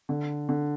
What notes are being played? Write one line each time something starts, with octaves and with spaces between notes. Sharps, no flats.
D3
D3